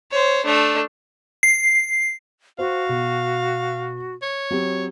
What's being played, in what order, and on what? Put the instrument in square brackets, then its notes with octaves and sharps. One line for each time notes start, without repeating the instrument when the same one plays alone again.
[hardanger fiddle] C5 C#5
A3 D4
[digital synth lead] C7
[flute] F#4 [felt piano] C5 [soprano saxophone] F5
[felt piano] B2
[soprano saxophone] C#5
[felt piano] F#3 C4 G4